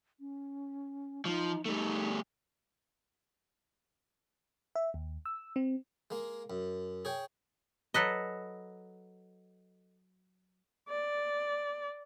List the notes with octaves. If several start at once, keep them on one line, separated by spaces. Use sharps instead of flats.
C#4
F3 D#4
G3 A3 D#4
E5
D#2
E6
C4
G#3 A#3
F#2
G#4 C#5 G5
F#3 A4 B4 D#5
D5